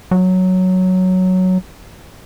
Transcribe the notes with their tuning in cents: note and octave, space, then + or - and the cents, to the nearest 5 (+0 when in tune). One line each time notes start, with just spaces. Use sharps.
F#3 +0